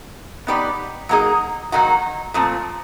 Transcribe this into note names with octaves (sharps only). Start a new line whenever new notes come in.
B3 D#4 G4 B4 D5
F#3 A#3 D#4 G#4
D#3 F#3 A#3 D#4 F#4
A#2 F3 A3 C4